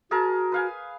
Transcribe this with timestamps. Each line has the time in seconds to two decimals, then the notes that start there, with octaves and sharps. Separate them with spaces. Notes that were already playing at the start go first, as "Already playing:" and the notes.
0.11 F#4 G#4 A#4 A5
0.52 B4 F5 G#5